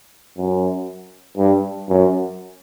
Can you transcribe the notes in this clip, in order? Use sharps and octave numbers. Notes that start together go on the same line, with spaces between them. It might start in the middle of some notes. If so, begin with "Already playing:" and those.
F#2
G2
F#2